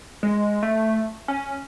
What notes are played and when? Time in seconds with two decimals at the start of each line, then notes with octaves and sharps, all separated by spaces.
0.23 G#3
0.63 A3
1.28 C#4